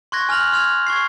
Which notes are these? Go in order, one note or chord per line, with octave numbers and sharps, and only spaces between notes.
C6 C#6 F#6 G#6 A#6
G#5 F6 A#6 F7 F#7
C6 F6 G#6 F7
C#6 G#6 C7